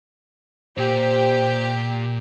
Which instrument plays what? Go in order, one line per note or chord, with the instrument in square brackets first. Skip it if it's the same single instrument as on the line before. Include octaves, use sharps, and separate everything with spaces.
[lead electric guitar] A#2 [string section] G4 [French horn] C5